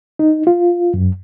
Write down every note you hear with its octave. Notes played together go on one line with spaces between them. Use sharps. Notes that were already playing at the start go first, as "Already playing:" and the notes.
D#4
F4
F#2